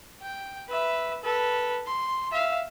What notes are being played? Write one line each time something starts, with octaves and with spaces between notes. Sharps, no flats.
G5
B4 E5
A4 B4
C6
E5 F5